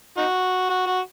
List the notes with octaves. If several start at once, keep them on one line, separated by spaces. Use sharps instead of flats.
D#4 F#4
F#4
F#4